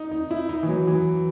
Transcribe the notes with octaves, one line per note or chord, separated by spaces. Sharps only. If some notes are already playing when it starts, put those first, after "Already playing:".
Already playing: D#4
D#4
E4
D#4
E3
F#3
E3